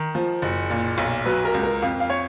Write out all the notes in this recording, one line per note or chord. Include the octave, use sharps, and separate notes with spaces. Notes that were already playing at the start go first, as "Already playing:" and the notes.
Already playing: D#3
F3
F#1
A#2
B1
F#3 B4
A#4
C#2
A#4
F2 F5
F5
C#5